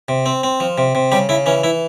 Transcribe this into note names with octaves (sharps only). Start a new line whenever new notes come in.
C3
C4
C4
F3
C3
C3
C#3 G3 G4
C#3 E4
E3 C#4
E3 E4